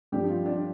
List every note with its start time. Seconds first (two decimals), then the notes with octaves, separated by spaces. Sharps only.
0.12 G2 F3 C4 D4 G4
0.29 F4
0.46 D4